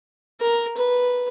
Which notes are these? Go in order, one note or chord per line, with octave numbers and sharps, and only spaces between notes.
A#4
B4